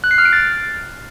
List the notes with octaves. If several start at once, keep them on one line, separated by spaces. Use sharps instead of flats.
F#6
C7
F6
D7
A6